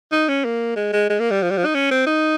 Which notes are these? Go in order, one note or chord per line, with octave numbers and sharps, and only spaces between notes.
D#4
C#4
A#3
G#3
G#3
G#3
A#3
G3
F3
G3
F3
D#4
C#4
C4
D#4